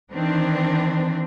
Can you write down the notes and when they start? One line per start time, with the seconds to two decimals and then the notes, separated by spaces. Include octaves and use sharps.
0.11 D#3 E3 C4 D4